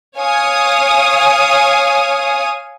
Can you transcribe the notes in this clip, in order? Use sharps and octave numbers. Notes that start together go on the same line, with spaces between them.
C#5 F5 G#5 D#6